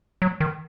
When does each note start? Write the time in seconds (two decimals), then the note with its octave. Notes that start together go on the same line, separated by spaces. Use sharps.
0.22 F#3
0.40 D#3